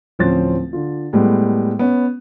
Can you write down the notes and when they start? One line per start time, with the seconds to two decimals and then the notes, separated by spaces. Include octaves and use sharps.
0.19 D1 F3 C4 C#4 A6
0.73 D3 F4
1.13 A2 G3 G#3 B3
1.79 B3 C#4